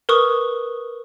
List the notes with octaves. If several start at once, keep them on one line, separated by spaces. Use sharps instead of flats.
A#4 B4 C#6 D#6